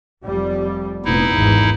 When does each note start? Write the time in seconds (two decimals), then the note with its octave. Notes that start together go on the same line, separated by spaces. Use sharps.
0.25 F1 F2 G3
1.05 F1 A#2 B3 D#4 E4
1.34 G#1 E2 G#2